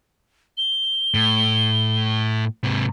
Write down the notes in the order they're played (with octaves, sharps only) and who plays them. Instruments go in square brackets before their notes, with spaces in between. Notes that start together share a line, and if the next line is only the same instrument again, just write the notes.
[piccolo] G7
[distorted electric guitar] A2
G#2 C3